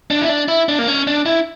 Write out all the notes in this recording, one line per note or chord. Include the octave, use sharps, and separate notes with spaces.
D4
E4
D4
E4
D4
A#3
C#4
D4
E4